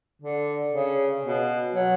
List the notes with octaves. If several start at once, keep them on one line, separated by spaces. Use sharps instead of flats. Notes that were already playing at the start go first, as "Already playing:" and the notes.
D3
C#3
B2
F#3